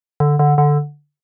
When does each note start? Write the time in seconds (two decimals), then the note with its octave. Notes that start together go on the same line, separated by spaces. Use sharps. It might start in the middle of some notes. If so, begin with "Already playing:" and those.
0.20 D3
0.39 D3
0.58 D3